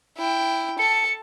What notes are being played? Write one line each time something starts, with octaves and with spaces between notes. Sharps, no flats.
E4 G5
A4 A5 C#7